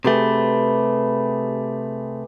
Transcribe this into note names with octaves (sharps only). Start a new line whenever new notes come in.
C3 A3 G4 G#4 B4